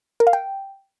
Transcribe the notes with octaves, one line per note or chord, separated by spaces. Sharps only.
A#4
F5
G5